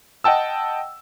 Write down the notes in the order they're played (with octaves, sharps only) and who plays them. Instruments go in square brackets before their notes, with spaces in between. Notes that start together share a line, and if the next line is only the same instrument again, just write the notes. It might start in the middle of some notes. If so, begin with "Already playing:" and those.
[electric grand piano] D#5 F#5 G5 A5 E6